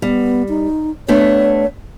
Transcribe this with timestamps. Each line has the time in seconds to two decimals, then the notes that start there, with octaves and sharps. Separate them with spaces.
0.02 G3 B3
0.49 D#4
1.08 A3 B3 D4 C#5